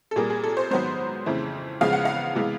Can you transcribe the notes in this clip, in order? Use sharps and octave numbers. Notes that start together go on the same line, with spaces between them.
A4
A#2 G3 A#3 G#4
G#4
A4
C5
G#2 D#3 F#3 B3 C5
F2 C#3 E3 A3
E2 C#3 F3 G#3 B3 F5
F#5
F5
C3 E3 G#3 B3